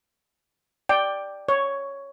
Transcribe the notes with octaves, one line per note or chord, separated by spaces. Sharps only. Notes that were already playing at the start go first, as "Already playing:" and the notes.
D5 G5
C#5